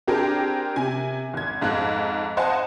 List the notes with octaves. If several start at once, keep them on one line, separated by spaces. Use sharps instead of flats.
C4 D4 G4 G#4 A#4
C3 G#5
G#1 G#6
F2 G#2 F5 F#6
C5 D#5 F5 F#5 G#5 A5